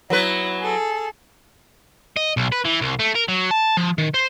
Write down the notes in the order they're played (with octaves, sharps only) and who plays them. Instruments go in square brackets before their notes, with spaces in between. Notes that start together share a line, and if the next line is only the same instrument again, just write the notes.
[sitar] F#3 B3 B4 [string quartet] E4
[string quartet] G#4 A4
[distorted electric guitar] D#5
B1
B4
E3
C2
A3
A#4
F#3
A5
F3
D#3
C5